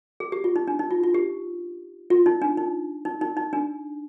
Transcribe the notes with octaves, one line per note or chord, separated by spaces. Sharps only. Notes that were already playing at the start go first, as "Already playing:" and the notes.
G#4
G4
F4
D#4
D4
D#4
F4
F4
G4
F4
D#4
D4
D#4
D#4
D#4
D#4
D4